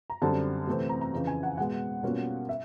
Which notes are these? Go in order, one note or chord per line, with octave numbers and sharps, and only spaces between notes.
A#5
F#2 D3 G3 C4 A5
C3 E3 A3 C4
A#5
A#5
F2 C#3 E3
G#5
F#5
B2 G#3 B3 F#5
B2 G3 A#3 C#4 F4
E5